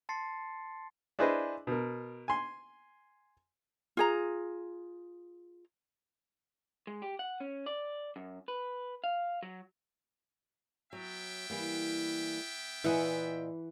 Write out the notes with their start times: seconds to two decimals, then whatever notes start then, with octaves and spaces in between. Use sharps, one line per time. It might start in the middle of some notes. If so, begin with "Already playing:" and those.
0.09 A5 C6 A6 C7 C#7
1.19 D4 E4 G#4 B4 C5 D#5
1.67 B2 A#4
2.28 G#5 C6
3.97 F4 G#4 A#5
6.87 G#3
7.02 G4
7.19 F#5
7.40 C#4
7.66 D5
8.16 F#2
8.48 B4
9.04 F5
9.43 F#3
10.93 F#3 B3 E5 G5
11.50 E3 G3 A#3
12.84 A#2 E3 D#5 F#5 G#5 B5